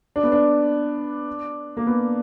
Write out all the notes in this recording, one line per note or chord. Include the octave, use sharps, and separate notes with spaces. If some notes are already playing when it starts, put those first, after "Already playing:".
D4
B3
D4
A#3
B3